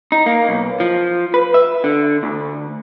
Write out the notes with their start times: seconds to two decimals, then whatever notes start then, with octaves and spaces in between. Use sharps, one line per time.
0.12 D#4
0.26 A#3
0.49 B1
0.80 F3
1.34 B4
1.54 E5
1.84 D3
2.23 D2